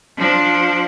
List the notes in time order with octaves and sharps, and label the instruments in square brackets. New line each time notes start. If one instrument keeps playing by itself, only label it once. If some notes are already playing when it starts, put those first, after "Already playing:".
[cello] F3 D4